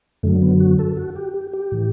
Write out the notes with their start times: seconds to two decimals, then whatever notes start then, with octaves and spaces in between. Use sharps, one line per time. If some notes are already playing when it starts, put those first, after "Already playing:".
0.23 F#2 D3 F#3 A3
0.42 B3
0.60 F#4
0.79 A4
0.97 F#4
1.16 G4
1.34 G4
1.53 G4
1.72 A2 E3